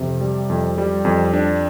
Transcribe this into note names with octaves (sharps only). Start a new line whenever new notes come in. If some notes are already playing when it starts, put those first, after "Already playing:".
Already playing: F2 C3
G3
F2
G3
F2
D4